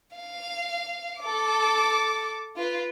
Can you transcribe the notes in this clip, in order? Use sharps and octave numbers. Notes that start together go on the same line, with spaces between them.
F5
A4 D6
F4 B4